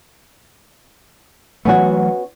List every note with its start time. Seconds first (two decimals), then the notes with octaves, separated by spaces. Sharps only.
1.65 E3 F#3 A3 B3 C#4 F#4